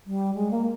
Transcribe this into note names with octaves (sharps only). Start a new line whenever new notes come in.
G3
G#3
A#3